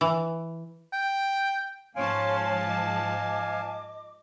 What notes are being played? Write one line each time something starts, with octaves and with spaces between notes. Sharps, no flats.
E3
G5
G#2 F3 C#4 C#5 F5 G#5 A5 C6
D#5 D6